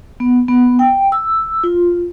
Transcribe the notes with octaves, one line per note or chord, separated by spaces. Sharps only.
B3
B3
G5
E6
F4